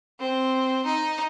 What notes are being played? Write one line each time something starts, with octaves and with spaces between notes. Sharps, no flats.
C4
D#4